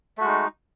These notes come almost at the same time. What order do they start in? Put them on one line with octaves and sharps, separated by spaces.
A3 F#4 G#3 D#4